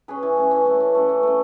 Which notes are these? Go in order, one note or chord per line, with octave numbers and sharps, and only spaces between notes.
C#4 G#4 B4
E3
A3 C#4
E3
A3 C#4
E3
A3 C#4
E3
A3 C#4